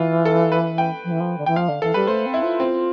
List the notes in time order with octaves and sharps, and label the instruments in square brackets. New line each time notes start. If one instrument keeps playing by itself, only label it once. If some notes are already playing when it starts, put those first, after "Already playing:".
Already playing: [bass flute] E3 [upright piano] F4
[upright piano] A4
B4
G5
[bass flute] F3
E3
F3
D3
[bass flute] E3 [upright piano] G5
[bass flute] F3 [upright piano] F5
[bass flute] D3
[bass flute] E3 [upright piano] A4
[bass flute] G3 [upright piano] B4
[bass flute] A3 [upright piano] C5
[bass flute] C4
[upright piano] E4
[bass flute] F4
[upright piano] C4